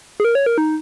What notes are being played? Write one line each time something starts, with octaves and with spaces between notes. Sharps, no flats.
G#4
A#4
C#5
A#4
D#4